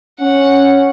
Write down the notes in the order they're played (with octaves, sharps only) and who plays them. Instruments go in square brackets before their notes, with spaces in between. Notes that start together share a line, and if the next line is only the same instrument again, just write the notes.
[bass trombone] C#4 [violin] F#5